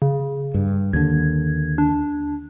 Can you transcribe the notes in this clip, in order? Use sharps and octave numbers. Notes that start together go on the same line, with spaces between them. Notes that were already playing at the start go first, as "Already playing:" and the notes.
C#3
G2
D#2 D3 G#6
D4